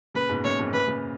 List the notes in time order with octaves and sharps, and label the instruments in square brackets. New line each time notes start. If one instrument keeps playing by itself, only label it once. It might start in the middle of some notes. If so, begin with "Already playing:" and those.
[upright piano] A#2 C#3 [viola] B4
[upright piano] G#2 B2
[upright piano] F#2 A#2 [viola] C#5
[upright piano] F2 G#2
[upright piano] F#2 A#2 [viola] B4
[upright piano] A#2 C#3